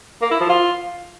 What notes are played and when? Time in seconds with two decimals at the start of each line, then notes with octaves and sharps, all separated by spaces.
0.22 A#3
0.31 E4
0.40 F3
0.50 F4